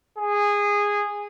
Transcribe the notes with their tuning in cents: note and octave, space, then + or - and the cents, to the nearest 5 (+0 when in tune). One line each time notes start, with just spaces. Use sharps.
G#4 -15